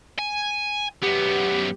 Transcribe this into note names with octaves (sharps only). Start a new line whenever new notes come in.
G#5
F#2 B3 G4